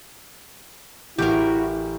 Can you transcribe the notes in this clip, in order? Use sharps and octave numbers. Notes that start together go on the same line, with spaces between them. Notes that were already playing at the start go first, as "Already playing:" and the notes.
A1 E4 F#4 G4 A#4